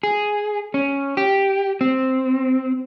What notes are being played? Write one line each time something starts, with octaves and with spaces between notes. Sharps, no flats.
G#4
C#4
G4
C4